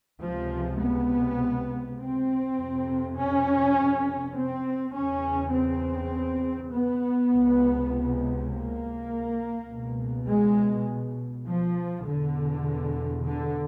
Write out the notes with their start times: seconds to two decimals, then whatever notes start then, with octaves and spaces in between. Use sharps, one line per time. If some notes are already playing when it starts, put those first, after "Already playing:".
0.20 C#2 C3 F3
0.80 B3
1.98 C4
2.57 F2 C3
3.17 C#4
4.35 C4
4.94 E2 C#3 C#4
5.54 C4
6.72 B3
7.31 C#2 C3
8.50 A#3
9.68 C#2 B2
10.27 G#3
11.46 F3
12.05 E2 B2 D3
13.23 D3